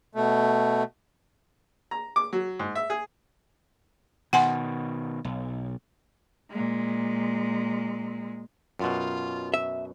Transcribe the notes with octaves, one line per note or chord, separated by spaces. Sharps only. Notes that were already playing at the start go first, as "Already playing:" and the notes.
B2 A3
A#5
D6
F#3
G#2
E5
G#4
B2 D#3 F#5 G#5 C6
B1
A#2 G#3
F#2 B2 F4
E5